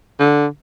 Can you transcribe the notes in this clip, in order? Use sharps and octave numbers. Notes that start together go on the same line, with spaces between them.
D3